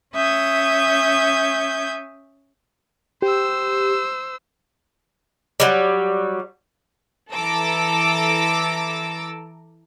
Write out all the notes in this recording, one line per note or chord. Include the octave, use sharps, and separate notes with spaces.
C#4 E5 D#6 G6 G#6
G4 C5 E6
F#3 G3
E3 A4 A#5 D6 E6